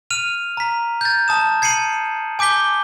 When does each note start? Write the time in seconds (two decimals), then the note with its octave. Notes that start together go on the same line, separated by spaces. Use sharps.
0.10 F6 D#7 F7
0.57 A#5 B6
1.01 G6 A6
1.28 A5 D#6 E7
1.62 G#6 C7 C#7 D#7 F#7
2.39 G#5 D6 G6 B6 G7